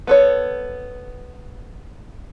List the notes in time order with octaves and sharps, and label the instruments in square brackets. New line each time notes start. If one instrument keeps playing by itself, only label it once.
[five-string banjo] B3 A4 C#5